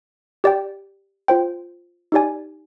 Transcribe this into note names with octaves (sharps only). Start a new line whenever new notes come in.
G4 D5 G5
F4 C5 G5
D#4 G4 D5 G#5